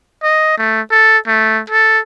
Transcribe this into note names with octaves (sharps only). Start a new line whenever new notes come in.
D#5
A3
A4
A3
A4